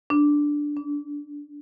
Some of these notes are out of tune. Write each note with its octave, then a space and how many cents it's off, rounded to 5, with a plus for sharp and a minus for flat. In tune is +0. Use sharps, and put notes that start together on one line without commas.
D4 +0
D4 -30